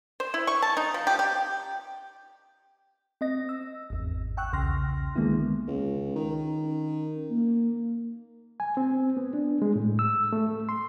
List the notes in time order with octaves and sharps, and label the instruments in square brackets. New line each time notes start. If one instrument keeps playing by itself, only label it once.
[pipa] C5
E4
C#6
A5
D#4
F3
G4
G4
[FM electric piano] C4 D#5 A#6
E6
G#1 E2
F#5 G5 C#6 E6 F#6
B1 E2 C#3 C6 F6 A#6
D3 D#3 G#3 A#3 B3 E4
[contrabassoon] C#2
D#3
[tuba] C#4
A#3
[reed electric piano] G#5
C4
B3
D4
G#3
A2
E6
A3
C6